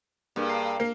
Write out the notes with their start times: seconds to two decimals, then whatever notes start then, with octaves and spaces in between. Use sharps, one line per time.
0.36 G2 A#3 G#4 A#4
0.49 F5 A#5 C7
0.80 A#3 F6